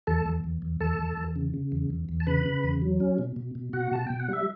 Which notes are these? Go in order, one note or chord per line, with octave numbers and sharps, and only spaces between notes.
E2 A4 A5
E2
E2
E2
E2 A4 A5
E2
E2
C#3
C#3
E2
E2
E2
A5
C#3 B4 B5
C#3
E2
F#3
C#4
B2
B2
B2
B2 F#4 F#5
B2 A5
B2 G5
F#5
G3 E5